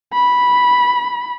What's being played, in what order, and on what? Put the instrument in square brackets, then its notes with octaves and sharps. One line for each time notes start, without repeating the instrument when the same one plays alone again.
[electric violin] B5